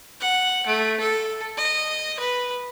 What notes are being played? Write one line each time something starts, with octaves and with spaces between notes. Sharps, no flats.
F#5
A3
A4
D#5
B4